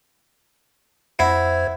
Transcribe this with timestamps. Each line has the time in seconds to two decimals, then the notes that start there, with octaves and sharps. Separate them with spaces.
1.19 F2 E4 C5 E5 F#5 G#6